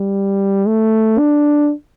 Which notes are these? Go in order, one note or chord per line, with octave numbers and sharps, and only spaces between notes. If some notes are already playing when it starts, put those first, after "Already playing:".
Already playing: G3
A3
D4